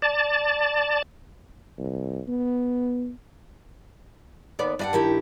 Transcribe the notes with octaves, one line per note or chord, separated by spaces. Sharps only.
D5 A5
C2
B3
D#2 B3 D5
G2 D5 D#5 F#5
D#3 E4 G4